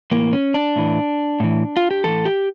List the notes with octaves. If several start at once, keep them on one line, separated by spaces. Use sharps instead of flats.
A2 E3 A#3
C#4
D4
A2 E3
A2 E3
F4
G4
A2 E3 A4
G4